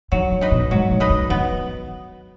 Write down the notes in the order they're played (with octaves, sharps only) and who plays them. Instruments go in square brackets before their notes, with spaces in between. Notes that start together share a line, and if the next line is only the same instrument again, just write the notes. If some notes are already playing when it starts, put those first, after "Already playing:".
[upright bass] D#3 [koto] F#3
[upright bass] C#3
[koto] D#4 B4 D#5
[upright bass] B2
[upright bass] G#2 [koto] F#3
[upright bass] G#2
[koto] D#4 B4 D#5
[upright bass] C#3
[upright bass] D#3 [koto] B3